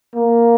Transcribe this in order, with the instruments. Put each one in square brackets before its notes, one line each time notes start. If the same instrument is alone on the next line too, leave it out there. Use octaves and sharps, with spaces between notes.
[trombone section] A#3